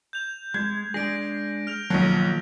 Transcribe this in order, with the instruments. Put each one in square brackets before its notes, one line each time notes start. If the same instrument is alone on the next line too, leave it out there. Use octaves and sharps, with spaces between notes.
[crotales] G6 F7
[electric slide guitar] G#3 [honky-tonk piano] G#6
[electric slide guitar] G#3 D4 G#4 [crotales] A#6 D7
[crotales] F6 F7
[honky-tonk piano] B1 F#3 [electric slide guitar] D#3 F3 A#3